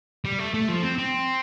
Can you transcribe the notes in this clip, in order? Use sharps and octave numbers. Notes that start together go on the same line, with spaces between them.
G3
A3
A3
F3
C4
C4